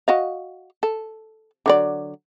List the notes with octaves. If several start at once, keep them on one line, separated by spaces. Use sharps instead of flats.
F#4 D#5 F5
A4
D3 F#3 D5